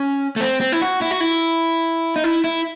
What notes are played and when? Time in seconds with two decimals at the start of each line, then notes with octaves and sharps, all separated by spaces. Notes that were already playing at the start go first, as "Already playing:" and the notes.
Already playing: C#4
0.36 A3
0.41 C4
0.61 C4
0.72 E4
0.81 F#4
1.02 E4
1.11 F#4
1.21 E4
2.16 D#4
2.24 E4
2.44 E4